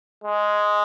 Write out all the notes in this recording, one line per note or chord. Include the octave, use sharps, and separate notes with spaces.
G#3